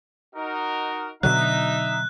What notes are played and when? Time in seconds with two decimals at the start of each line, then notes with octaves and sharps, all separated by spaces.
0.35 D#4 F#4 A#4
1.23 B2 D3 F#3 D#4 E5 F#6